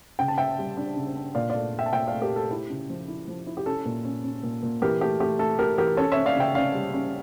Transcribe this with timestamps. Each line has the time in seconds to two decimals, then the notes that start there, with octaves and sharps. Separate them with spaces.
0.19 C#3 G5
0.28 A5
0.38 C#3 E5 G5
0.58 G3
0.77 D4
0.96 C#3
1.16 D4
1.35 A#2 D5 F5
1.50 A3 D5 F5
1.74 A3
1.79 E5 G5
1.86 A5
1.93 A#2 E5 G5
2.07 A3 D5 F5
2.22 G4 A#4
2.31 A3 A4
2.51 E4 G4
2.70 C#3
2.89 F3
3.08 E4
3.27 F3
3.47 E4
3.57 G4
3.66 C#4 A4
3.85 A#2
4.05 C#4
4.24 C#4
4.43 A#2
4.63 A#2
4.82 E3 G4 A#4
5.01 A3 G4
5.20 A3 G4
5.39 A3 A4
5.58 A3 G4 A#4
5.78 E3 G4 A#4
5.97 C#4 A4 C#5
6.12 C#4 C#5 E5
6.26 D5 F5
6.36 C#3 E5 G5
6.55 C#4 D5 F5
6.74 G3
6.94 C#4